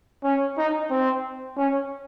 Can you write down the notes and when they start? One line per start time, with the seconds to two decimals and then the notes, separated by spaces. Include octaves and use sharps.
0.24 C#4
0.58 D#4
0.90 C4
1.57 C#4